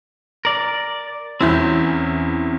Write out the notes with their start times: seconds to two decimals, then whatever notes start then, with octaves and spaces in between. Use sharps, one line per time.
0.45 A#4 D5
1.41 E2 C4 C#4 E4 G6